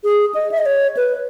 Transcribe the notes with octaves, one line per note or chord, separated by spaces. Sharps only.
G#4
D#5
E5
D#5
C#5
B4